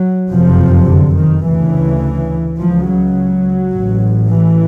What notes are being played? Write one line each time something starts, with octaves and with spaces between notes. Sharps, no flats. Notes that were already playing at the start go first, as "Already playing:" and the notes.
Already playing: F#3
F#1 F2 C3 F3
D3
D#3
D2 C#3 E3
C#2 C#3 F3
F#3
A1 A2
E3